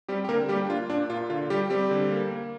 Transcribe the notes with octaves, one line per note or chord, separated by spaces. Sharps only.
G3 C4 G4
G4
D3 A#3 A#4
G3 A#3 G4
D4
A#3 F4
A#2 D4
A#2 F4
D3 F4
G3 G4
G3 C4 G4
D3
A#3
A#3